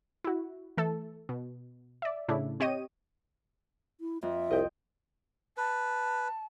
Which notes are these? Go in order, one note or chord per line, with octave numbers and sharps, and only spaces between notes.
E4 F#4
E3 A3 A4
B2
D5 E5
A2 C#3 A3 D4 E4
C4 G4 C#5 D#5 D#7
E4
F2 E5
C2 D#5 G5
B4 A5